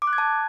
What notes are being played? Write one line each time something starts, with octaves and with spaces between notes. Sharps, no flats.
D6
F#6
G#6
A5